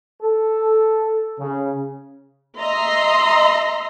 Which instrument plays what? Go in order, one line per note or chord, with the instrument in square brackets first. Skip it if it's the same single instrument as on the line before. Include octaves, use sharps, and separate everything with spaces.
[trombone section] A4
C#3
[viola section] D#5 E5 A#5 C6